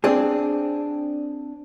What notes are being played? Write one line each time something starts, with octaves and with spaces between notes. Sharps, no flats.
C4 D4 G#4